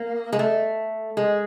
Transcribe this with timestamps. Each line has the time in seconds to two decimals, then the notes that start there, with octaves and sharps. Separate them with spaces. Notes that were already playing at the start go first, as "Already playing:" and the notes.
Already playing: A#3
0.32 G#3
0.39 A3
1.17 G#3